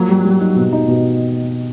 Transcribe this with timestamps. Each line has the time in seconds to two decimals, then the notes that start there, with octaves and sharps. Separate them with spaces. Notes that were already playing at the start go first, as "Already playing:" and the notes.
Already playing: F3 F#3 A#3
0.09 G3
0.25 G3
0.40 D#4
0.56 B2
0.72 D#4
0.88 B2